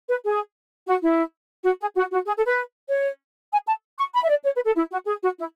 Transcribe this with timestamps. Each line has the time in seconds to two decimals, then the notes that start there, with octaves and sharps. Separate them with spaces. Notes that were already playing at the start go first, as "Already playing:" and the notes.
0.09 B4
0.25 G#4
0.87 F#4
1.03 E4
1.65 F#4
1.81 G#4
1.96 F#4
2.12 F#4
2.27 G#4
2.37 A4
2.48 B4
2.89 C#5
3.52 G#5
3.67 A5
3.98 C#6
4.14 B5
4.24 E5
4.29 D5
4.44 C#5
4.56 B4
4.66 A4
4.76 E4
4.92 F#4
5.06 G#4
5.22 F#4
5.38 E4